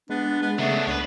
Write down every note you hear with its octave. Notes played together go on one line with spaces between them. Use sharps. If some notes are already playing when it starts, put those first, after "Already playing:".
G#3 B3 D4
B3
C#3 F#3 A3 B3 D4
C#2 D4 B4 C#5